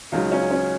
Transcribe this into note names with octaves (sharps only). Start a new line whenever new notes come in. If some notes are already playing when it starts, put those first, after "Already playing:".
C#2 C#3 F#3 D#4
C#4
C#4